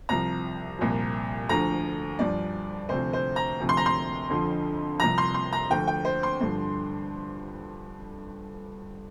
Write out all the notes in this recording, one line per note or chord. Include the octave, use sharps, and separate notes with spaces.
C2 C3 F3 A#5
C2 A#2 F3
D2 D3 F3 A#5
G2 F3 D5
D2 C3 F3 C5
C5
A#5
D2 C3 F3
C6
A#5
C6
F2 D3 F3
C2 C3 F3 A#5
C6
C6
A#5
D2 D3 F3 G5
G5
C5
C6
G2 D3 F3